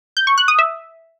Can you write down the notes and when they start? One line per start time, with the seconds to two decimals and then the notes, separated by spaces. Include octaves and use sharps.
0.17 G6
0.27 C#6
0.38 F#6
0.48 D#6
0.59 E5